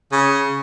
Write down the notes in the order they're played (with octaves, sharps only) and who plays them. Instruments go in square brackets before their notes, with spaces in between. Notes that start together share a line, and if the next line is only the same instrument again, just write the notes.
[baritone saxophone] C#3